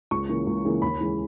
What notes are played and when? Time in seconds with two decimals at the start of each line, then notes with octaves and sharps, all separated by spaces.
0.11 C#2 C#6
0.29 C#3 E3 A#3
0.47 C#2
0.65 C#3 E3 A#3
0.82 D#2 B5
1.00 C#3 E3 G#3